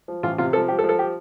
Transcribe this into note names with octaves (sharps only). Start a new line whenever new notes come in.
F3
A1 F4
C3 F4
F3 A4
F3 G4
A4
F3
A4
G4